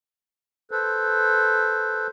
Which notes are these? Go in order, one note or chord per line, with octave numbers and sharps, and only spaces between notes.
A4 B4 C5